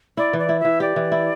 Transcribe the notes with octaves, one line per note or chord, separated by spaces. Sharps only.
E4 D5
E3
D5
E4
E5
E3
G4 D5
E3
E4